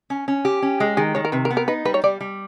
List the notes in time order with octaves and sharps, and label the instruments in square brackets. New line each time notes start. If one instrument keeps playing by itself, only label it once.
[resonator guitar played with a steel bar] C#4
C#4
G4
C#4
G#3
[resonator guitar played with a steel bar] D#3 [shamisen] G#4
[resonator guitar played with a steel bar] D#3 [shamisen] C#5
[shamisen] A#4
[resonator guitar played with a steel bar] C3 [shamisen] B4
[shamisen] A#4
[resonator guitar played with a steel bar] B3
[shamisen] A#4
[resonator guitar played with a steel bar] D#4 [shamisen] B4
[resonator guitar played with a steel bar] G3 [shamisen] B4
[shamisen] C#5
[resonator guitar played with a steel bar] G3 [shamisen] D5
[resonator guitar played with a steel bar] G3